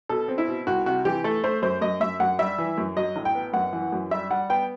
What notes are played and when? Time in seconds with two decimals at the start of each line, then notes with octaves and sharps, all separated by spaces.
0.09 B2 A4
0.28 C4
0.38 E4
0.48 B2
0.67 C2 F#4
0.86 C3 F#4
1.05 E3 G4
1.24 A3 A4
1.44 A3 C5
1.62 F#2 C5
1.81 F#2 D#5
2.01 F#2 E5
2.20 F#2 F#5
2.39 G3 E5
2.58 E3
2.78 F#2
2.97 F#3 D#5
3.16 A1
3.25 G5
3.35 B3
3.53 F#2 F#5
3.73 E3
3.92 F#2
4.11 G3 E5
4.30 G3 F#5
4.50 B3 G5